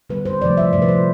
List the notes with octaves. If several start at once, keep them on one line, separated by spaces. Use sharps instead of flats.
D3 G3 B4
C5
C3 F3 A3 D5
E5
C3 F3 A3 D5
B4
C5